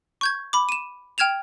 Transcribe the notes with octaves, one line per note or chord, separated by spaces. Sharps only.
C#6 G6 G#6
B5 D6
D#7 E7
G5 F6 G#6 E7 F7